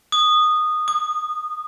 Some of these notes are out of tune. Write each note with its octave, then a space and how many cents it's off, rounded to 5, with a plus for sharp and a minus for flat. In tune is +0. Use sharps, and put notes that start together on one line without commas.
D#6 -15
D#6 -35